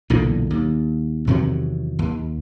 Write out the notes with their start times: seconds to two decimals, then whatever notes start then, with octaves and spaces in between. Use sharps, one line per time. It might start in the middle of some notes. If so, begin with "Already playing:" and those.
0.10 B1 E2 A#2 D3
0.50 D#2
1.27 E2 C3 D#3 F#3
1.99 D#2